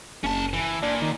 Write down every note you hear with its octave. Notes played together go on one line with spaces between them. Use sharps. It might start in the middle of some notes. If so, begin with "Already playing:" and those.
F#1 C#4 A5
E3
A#2 D4
D#3